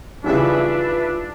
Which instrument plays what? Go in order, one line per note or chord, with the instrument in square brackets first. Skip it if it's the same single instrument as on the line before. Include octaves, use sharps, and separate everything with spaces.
[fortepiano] C#3 E3 G3 [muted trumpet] D4 [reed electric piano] D#4 F4 [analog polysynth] B4 E5